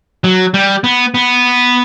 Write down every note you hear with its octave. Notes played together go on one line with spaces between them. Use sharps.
F#3
G3
B3
B3